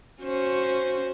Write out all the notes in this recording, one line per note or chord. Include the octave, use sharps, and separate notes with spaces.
C#4 F#4 C5